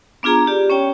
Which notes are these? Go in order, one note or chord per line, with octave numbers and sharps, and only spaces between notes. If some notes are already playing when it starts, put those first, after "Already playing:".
B3 D4 F4 G#4 A#5
G4 D5
C#4 C#5 G5